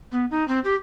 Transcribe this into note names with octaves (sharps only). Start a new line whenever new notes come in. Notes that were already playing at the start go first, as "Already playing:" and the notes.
B3
D#4
C4
G4